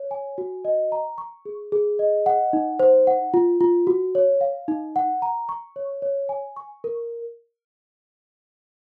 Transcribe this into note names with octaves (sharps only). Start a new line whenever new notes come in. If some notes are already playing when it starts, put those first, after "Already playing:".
Already playing: C#5
G#5
F#4
D#5
A#5
C#6
G#4
G#4
D#5
F#5
D#4
C5
F#5
F4
F4
F#4
C#5
F5
D#4
F#5
A#5
C#6
C#5
C#5
G#5
C#6
A#4